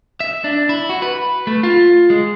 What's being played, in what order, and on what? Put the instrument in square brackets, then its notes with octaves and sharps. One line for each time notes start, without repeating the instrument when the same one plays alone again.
[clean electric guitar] E5
D4
E4
F#4
B4
A3
F4
G#3